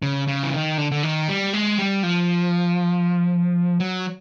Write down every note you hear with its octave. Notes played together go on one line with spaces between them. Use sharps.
C#3
C#3
E3
D#3
D3
D3
D#3
G3
G#3
G3
F3
F#3